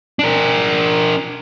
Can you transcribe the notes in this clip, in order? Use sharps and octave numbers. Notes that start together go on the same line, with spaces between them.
D4 A#4